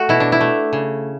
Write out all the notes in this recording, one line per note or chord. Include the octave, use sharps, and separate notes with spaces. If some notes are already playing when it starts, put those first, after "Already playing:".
Already playing: A3 F#4
B2 E4
D4
E4
A3
C#3